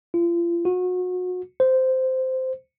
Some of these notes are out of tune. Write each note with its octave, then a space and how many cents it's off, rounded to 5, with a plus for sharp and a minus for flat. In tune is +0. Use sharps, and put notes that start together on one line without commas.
F4 -35
F#4 -30
C5 -10